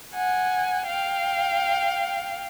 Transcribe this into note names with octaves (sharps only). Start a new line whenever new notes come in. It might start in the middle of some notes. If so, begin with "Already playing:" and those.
F#5 G#5
F5 G5